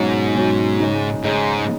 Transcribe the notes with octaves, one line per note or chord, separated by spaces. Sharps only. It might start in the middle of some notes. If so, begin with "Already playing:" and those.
Already playing: G#2 B2 F#3 C#4 F#4 C#5
B2 F#3 C#4 F#4 C#5
C#3 G#3 D#4 G#4 C#5
G#2 C#3 G#3 D#4 G#4 C#5